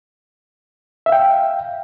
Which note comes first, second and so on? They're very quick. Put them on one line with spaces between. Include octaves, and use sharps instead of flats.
E5 F5 G5